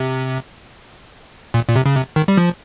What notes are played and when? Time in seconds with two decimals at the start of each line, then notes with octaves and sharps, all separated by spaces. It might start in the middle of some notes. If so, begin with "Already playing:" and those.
Already playing: C3
1.54 A#2
1.69 A#2
1.76 C3
1.86 C#3
1.96 C3
2.16 D#3
2.28 G3
2.37 F3